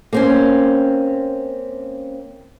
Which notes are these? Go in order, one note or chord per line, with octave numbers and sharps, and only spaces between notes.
A#3 C4 C#4